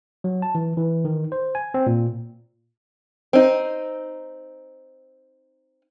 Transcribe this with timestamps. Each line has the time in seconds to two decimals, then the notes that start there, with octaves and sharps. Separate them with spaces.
0.24 F#3
0.42 A5
0.55 E3
0.77 E3
1.05 D#3
1.32 C5
1.55 G#5
1.74 C4
1.87 A#2
3.33 C4 D#4